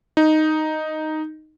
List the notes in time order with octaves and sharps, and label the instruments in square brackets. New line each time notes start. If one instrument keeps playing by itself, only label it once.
[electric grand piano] D#4